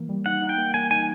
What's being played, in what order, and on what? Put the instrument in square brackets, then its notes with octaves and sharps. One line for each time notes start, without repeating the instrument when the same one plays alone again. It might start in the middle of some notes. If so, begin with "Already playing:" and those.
Already playing: [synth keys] E3 A#3
G3
[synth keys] D#4 [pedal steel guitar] F#5
[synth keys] D#4
[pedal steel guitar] G5
[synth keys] A#3
[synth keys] A#3 [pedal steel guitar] G#5
[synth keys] D#4 [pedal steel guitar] G#5